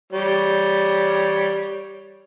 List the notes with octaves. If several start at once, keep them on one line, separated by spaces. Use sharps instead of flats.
G3 C#5